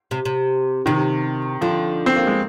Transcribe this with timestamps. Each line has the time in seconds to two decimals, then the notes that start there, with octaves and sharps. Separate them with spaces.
0.11 C3
0.25 C3
0.86 C3 D#3
1.61 D3 F3
2.06 C4
2.16 A#3
2.27 G#3